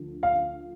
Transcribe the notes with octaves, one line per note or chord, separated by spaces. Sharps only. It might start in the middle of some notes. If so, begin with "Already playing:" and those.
Already playing: D2 F3
F5